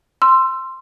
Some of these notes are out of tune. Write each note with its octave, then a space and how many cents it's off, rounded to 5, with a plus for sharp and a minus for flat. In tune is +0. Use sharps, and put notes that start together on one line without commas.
C6 +0 E6 +25